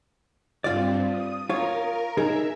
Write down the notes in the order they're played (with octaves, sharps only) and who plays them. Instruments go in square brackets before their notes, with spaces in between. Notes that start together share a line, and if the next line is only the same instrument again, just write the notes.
[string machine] G2 C4 [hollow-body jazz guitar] F4 D5
[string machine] D#6
[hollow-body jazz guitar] F4 C#5 [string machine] A#4 A#5
[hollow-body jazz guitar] D#4 G#4 A#4 [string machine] E5